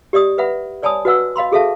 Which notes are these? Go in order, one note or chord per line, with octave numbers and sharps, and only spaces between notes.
G4 D5 D#5 D#6
B4 E5 F#5 B5
C#5 D5 G#5 A5 B5 D#6
F#4 B4 D#5 F#5 E6
D#5 F5 B5 C6
F#4 G#4 A4 E5 F5 A5